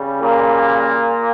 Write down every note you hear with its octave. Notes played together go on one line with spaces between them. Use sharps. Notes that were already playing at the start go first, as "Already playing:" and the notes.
Already playing: C#3 G3
A#2 A#3